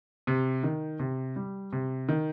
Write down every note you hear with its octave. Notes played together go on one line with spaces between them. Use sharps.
C3
D#3
C3
G3
C3
D#3